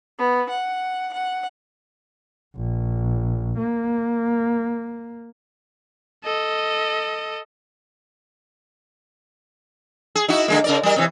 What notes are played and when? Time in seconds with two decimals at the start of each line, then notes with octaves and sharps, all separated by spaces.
0.18 B3
0.50 F#5
1.15 F#5
2.56 A#1
3.58 A#3
6.24 A4 D#5
10.15 G#4
10.28 D#4 E4 F#4
10.48 D3 G#3 A#3
10.64 C#3 A#4 D5
10.83 G3 A#4
10.96 C3 E3